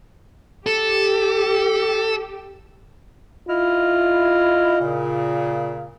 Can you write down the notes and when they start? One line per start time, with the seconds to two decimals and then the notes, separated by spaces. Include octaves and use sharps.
0.67 G4 A4
3.49 E4 F4 D#5 F6
4.80 A#2 C#3